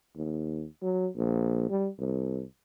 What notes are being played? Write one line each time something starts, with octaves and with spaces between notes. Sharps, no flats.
D#2
F#3
A#1
G3
C2